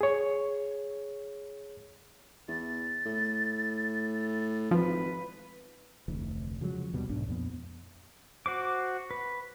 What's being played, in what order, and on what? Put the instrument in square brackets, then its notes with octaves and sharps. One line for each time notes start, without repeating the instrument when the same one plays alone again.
[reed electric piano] G#4 C#5
[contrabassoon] E2 [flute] A6
[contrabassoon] A2
[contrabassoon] G#1 [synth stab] F3 [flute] B4
[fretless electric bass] F1 D2 E3
C#3 F3 F#3 G#3
D#2 B2 G3 B3
B1 G#2 D4
F2 A#2 B3
[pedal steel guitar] F#4 C5 D6
B4